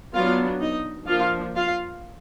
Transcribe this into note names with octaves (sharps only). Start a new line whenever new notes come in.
F#3 B3 D4 F4 F5
D#4 D#5
F3 A#3 D4 F4 F5
F4 F5